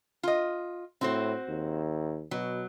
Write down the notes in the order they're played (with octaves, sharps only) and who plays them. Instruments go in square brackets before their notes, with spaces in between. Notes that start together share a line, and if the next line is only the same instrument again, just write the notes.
[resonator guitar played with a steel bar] F4 D#5
[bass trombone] A2 [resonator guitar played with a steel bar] C4 F#4 C5
[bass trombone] D#2
[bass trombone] B2 [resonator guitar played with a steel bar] F#3